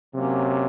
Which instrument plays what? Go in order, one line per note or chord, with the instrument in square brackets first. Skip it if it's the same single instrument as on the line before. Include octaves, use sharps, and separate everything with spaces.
[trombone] C3 [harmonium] F#3 A#3 C#4